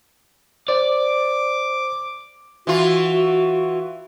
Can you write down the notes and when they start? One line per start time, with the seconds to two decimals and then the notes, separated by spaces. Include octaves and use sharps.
0.68 C5 D5 D6
2.67 E3 F4 F#4